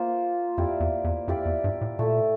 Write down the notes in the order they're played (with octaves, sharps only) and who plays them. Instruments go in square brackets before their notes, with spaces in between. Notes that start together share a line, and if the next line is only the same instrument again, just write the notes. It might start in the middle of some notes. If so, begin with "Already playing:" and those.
Already playing: [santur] A#3 F4 C5
[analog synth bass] F2 [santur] E4 G4 D5 F5
[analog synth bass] E2
E2
[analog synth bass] F2 [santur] E4 G4 D5 F5
[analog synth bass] E2
G2
A2
[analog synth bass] A#2 [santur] A3 E4 A4